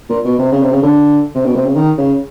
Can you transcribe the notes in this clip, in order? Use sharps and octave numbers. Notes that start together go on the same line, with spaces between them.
A#2
B2
C3
C#3
C3
C#3
D3
C3
B2
C3
C#3
D#3
C#3